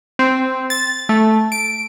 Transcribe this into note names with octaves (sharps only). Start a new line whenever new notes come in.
C4
A6
A3
D7